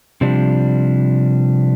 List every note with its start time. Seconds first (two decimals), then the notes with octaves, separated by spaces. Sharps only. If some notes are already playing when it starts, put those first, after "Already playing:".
0.21 C3 F3 G3 D4